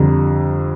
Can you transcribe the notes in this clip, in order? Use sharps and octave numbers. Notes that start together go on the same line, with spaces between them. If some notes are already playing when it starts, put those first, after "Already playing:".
Already playing: F2 D3 G3 A#5